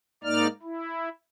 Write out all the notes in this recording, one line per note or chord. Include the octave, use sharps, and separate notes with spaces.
G#2 A#3 D#4 D5 F6
E4